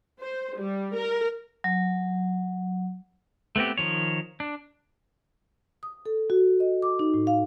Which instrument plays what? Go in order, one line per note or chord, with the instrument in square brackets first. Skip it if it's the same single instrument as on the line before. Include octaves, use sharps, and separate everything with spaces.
[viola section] C5
G3
A#4
[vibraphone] F#3
[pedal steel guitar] A3 B3 C4 G4
D#3 F3 C#5
D4
[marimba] D#6
A4
F#4
D#5
D6
D#4
A2
F5